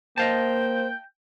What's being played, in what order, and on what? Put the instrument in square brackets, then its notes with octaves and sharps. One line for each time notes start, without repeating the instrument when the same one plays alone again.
[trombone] A#3 [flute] C5 [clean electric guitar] D#5 F5 A5 [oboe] G5